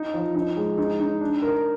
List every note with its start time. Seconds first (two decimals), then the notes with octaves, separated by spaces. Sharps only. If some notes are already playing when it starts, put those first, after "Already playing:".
Already playing: D#4
0.14 F3
0.35 D#4
0.56 G#3
0.78 D#4
1.00 D#4
1.21 D4
1.42 A#4